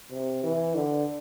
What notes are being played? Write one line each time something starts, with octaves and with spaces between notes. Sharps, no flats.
C3
E3
D3